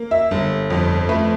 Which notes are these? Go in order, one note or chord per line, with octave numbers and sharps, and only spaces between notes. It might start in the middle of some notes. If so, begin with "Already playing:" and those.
Already playing: A#3
E5
G1
F2
A3 B4